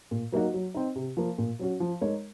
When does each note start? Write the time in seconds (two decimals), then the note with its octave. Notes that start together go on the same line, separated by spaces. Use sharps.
0.11 A#2
0.32 F#3 A#3 D#4 F#4
0.54 F#3
0.74 C4 D#4
0.96 C3
1.17 F3 A#3
1.38 A#2
1.59 F#3 C#4 F#4
1.80 F3
2.01 G#3 D#4 A#4 C#5